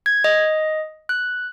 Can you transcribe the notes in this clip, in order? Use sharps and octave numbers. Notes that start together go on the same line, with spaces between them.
G#6
D#5
F#6